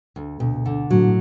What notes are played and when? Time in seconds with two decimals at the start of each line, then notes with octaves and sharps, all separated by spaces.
0.16 D2
0.40 D2 B2
0.66 D3
0.90 A2 F#3